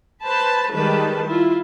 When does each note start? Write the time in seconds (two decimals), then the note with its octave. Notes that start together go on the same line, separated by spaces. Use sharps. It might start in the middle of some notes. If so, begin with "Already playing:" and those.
0.24 B4 C5 A5 B5
0.73 D#3 G3 G#3 B4 A5
1.27 E4 F4